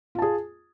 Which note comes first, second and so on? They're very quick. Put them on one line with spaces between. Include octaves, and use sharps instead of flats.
F4 A5 G#4